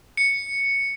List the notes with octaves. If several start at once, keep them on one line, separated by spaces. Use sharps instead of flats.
C#7